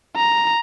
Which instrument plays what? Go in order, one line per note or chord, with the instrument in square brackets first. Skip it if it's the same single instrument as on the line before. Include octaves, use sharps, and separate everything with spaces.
[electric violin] A#5